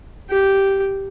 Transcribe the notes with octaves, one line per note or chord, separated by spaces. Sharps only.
G4